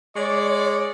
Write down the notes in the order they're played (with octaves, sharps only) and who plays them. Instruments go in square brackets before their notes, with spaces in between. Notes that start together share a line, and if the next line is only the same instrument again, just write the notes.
[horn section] G#3 D5 [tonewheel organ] C#5